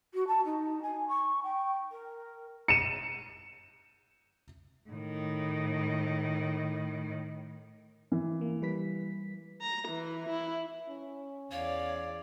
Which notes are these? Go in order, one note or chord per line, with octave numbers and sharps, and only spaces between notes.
F#4
A5
D#4
G#5
C#6
G5
A#4
C#7 D#7 E7
A2 D#3
E3
A#3
G3 B4 B6
A#5
E3
E4
C#4
E2 C#5 D5 F5